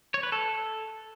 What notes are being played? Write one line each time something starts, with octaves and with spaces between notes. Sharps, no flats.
C#5
B4
A4